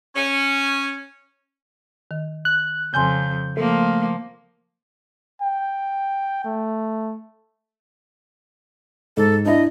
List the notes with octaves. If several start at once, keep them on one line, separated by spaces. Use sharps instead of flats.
C#4
D#3
F#6
F2 C#3 G#5 C6 G6
F3 A3 A#3
G5
A3
G#2 A4
D4 E4 D#5